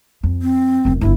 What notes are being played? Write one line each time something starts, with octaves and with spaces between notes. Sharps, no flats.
F2
C4
F1 F#2
G1 G2 E4